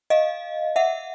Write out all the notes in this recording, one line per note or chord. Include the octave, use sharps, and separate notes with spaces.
D#5 F5
E5 F#5